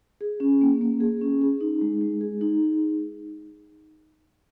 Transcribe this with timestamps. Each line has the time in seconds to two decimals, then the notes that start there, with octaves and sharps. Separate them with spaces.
0.21 G#4
0.40 C#4
0.61 A#3
0.81 A#3
1.00 G#4
1.21 C#4
1.41 G#4
1.61 D#4
1.81 G#3
2.01 G#3
2.21 G#4
2.41 D#4